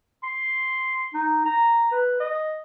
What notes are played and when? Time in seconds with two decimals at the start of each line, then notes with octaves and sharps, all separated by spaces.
0.23 C6
1.13 D#4
1.46 A#5
1.91 B4
2.20 D#5